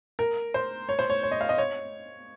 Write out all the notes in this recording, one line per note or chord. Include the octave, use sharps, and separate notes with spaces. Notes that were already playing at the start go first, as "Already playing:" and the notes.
A#4
C5
C#5
C5
C#5
C#5
D#5
F5
D#5
C#5